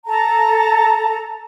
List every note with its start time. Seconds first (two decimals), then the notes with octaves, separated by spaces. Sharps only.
0.06 A4 A5 A#5